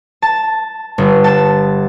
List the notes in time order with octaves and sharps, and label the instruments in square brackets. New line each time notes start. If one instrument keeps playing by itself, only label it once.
[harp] A5
G1
A5